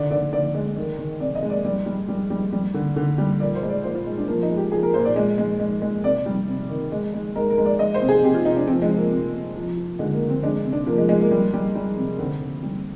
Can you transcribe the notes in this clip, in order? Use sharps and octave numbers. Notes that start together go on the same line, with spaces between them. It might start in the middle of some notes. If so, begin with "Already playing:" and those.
Already playing: D3 D5
D3 D5
D3 D5
G#3
D#3
D#3
C3 D5
D#5
G#3
D5
G3 D5
G3
G3
G3
G3
D3
D3
G3
A#2 D5
C5
G#3
D5
A#2 C5
F4
G#3
D4
F3 A#3
D#4
G#3
G4
F3 G#4
A#4
A#2 C5
D5
G#3
G#3
G#3
G#3
C3 D5
G3
C3
D#3
G#3
G#3
G#3 A#4
A#4
G#3
D5
G#3 D#5
C5
C3
G#4
C3 G4
F4
C3 D#4
D4
F3 C4
G#3
F3
A#3
C3 A#3
C3
F3
F3
D3 G#3
A#3
D3
C4
G#3 D4
C3
D4
F3 A#3
G#3
G#3
A#3
G3
G3
G3
C3
D3 C4
D3
G3